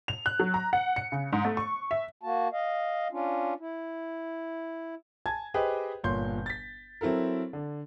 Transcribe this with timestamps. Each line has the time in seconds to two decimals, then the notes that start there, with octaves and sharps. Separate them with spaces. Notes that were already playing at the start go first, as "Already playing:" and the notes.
0.08 F7
0.26 F#6
0.40 F#3
0.54 A#5
0.73 F#5
0.96 C#7
1.12 C#3
1.33 G#2
1.45 A3
1.57 C#6
1.91 E5
2.23 A#3 F#4 A5
2.52 D#5 F5
3.11 C#4 D4 F4
3.60 E4
5.26 G#5 A5 G#6
5.54 G4 G#4 B4 C5 D#5 G5
6.04 G1 A#2 C#5 C6 G6
6.46 A6 B6
7.01 F#3 C4 E4 A4 A#4
7.53 D3